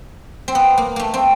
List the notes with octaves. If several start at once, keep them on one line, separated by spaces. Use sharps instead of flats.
C4
B3
A#3
A3 A#3
C4